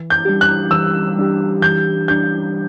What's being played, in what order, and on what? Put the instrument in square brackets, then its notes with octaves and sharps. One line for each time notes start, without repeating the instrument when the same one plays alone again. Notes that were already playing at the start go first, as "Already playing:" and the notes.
Already playing: [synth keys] E3
[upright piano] G6
[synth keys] G3 D4 G4
[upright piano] F#6
[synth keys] E3 [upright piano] E6
[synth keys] G3 D4 G4
[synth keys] E3 [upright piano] G6
[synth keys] G3 D4 G4 [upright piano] G6